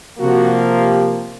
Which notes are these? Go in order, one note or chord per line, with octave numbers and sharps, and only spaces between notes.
C3 F3 A#3 F#4
G4